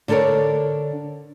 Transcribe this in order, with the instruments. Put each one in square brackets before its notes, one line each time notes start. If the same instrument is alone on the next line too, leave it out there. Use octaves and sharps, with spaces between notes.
[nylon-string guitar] D3 D4 A4 A#4 C#5